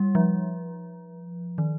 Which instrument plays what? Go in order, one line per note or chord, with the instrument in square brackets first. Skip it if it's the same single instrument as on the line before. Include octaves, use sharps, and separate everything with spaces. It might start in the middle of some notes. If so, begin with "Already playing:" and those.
Already playing: [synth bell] G3
F3
D#3